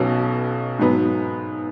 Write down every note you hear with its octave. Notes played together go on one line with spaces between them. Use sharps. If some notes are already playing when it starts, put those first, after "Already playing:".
Already playing: B1 B2 F#3 C#4 F#4
G#2 F#3 B3